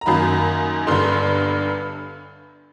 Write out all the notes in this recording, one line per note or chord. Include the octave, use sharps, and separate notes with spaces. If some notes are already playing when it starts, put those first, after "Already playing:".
A#5
F#2 D#3 F#3 A#3 B5
G1 G2 D3 C6